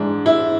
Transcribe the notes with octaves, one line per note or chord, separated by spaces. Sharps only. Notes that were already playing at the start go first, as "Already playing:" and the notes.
Already playing: G#2 E3 G#3 D4
E4